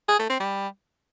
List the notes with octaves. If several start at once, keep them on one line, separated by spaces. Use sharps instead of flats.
G#4
A3
C4
G3